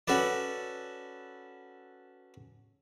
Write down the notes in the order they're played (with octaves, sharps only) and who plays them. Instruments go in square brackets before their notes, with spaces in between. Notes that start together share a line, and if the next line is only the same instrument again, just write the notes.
[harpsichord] C#4 F#4 A4 B4 D5